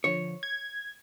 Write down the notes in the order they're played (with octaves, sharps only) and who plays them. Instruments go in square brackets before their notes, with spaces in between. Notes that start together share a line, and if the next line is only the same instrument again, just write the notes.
[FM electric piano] D3 F3 [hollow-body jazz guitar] C#5
[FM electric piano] G#6